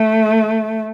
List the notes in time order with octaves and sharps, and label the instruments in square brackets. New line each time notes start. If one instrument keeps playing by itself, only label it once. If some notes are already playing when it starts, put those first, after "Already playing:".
Already playing: [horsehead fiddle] A3